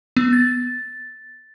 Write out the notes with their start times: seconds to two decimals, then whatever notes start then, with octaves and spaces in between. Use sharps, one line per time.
0.17 B3
0.33 A6